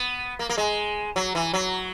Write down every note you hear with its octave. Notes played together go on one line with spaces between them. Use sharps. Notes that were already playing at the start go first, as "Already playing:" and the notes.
Already playing: B3
A#3
A#3
G#3
F#3
E3
F#3